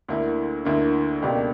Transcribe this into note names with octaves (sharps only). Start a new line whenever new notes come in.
D2 D3 A#3 E4
D2 D3 A#3 E4
C#2 B2 A#3 D4 G4